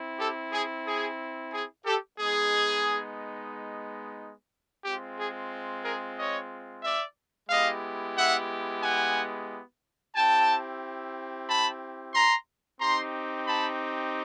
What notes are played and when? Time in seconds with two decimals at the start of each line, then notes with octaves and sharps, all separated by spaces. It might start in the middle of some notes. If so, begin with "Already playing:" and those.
Already playing: C4 E4
0.20 G4 A4
0.53 G#4
0.86 G#4
1.53 G#4
1.86 G4 A4
2.19 G#3 B3 D#4 G#4
4.84 G#3 C4 F4 G4
5.18 G#4
5.84 G#4 A#4
6.18 C#5 D#5
6.84 D5 E5
7.50 G#3 B3 E4 G4 D#5 F5
8.16 E5 F#5
8.82 F#5 G#5
10.15 C4 E4 G4 G5 A5
11.48 A5 B5
12.14 A#5 C6
12.80 C4 D#4 G4 A#5 C6
13.47 A5 B5